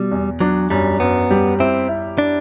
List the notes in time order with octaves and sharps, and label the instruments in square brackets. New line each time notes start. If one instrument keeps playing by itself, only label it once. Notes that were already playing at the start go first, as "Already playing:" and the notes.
Already playing: [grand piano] B2 [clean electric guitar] G3
[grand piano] E2
[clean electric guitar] F#3 [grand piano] D4
[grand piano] F#2 [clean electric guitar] G3
[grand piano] F#2 [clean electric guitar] B3
[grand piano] G3
[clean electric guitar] C4 [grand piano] E4
[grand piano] E4
[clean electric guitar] D4